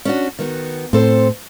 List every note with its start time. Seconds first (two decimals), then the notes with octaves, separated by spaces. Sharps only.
0.05 C#4 D4 F#4
0.39 D#3 B3 F#4
0.93 A2 C4 A4 C5